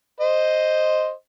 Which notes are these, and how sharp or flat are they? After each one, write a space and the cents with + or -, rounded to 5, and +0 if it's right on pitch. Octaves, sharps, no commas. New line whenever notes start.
C5 +0 D#5 +0